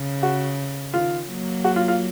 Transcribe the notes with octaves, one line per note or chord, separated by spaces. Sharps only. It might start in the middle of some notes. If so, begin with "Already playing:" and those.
Already playing: C#3
F#4
D#3 F4
F#3 A#3
F#4
F4
F4